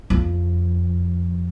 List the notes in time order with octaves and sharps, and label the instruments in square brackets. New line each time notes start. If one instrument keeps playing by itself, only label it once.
[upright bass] F2